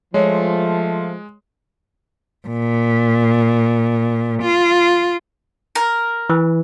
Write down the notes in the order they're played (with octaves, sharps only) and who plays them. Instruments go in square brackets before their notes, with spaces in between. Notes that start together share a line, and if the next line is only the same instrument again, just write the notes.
[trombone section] F3 [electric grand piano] G#3 [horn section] A3 F4 [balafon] C#5
[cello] A#2
F4
[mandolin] A#4
[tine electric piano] E3